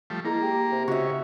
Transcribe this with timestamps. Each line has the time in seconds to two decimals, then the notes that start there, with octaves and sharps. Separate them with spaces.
0.10 F3 G3 A3
0.25 G#3 A#3 E4 G#4 A#5
0.42 G4
0.72 C3
0.88 C#3 F#4 E5